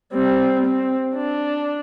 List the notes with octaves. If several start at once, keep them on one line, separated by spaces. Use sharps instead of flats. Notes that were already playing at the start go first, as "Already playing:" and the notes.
G3 C4
C4
D4